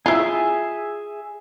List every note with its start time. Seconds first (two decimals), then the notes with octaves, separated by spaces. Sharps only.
0.06 E4 F4 G#4 E5